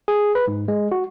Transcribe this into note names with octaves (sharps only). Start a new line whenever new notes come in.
G#4
B4
G#2
G#3
F#4